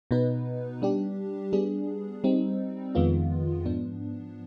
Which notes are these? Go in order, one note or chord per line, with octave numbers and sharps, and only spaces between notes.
B2 B3 D#4 B4
G3 D4 G4
G3 B3 D4 G#4
G3 C4 D#4
F2 D#3 G#3 B3 F4
G#2 F3 B3 D4